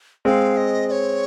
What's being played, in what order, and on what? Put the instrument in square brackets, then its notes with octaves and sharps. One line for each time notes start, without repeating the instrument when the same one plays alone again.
[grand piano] G#3 C4 [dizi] F5
[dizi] D#5
D#5
C#5